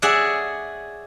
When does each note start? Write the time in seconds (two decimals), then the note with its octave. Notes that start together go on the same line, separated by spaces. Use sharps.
0.02 G#4 C#5 D5 E5 F#5 G#5